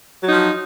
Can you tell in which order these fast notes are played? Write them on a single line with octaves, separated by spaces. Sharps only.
F#3 D#4 F3